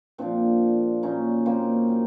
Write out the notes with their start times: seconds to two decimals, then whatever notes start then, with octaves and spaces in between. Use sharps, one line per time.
0.18 A#2 F3 C4 D4
1.03 A#2 F#3 C#4 D#4
1.46 A#3 C4
1.88 D#3 F#3